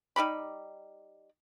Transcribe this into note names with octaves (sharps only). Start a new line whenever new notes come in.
G3 D#4 G4 B5